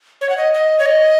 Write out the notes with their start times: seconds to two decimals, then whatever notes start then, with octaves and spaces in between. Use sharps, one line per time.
0.21 C#5
0.29 F#5
0.37 D#5
0.54 D#5
0.79 C#5
0.86 D#5